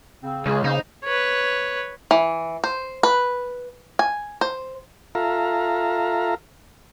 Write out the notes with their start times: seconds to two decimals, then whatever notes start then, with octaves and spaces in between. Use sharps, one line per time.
0.22 C#3 C4
0.46 C#2 C#3 G#4
0.64 C#3 A#3 B3 D#4 C5
1.04 B4 C#5
2.11 E3
2.64 C5
3.03 B4
3.99 G#5
4.41 C5
5.15 F4 A4 E5 F5 A#5